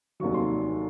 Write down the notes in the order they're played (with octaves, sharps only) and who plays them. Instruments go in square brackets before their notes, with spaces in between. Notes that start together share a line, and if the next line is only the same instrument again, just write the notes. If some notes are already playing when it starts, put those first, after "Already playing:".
[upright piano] F1 D#2 D#3 F#3 C#6
C6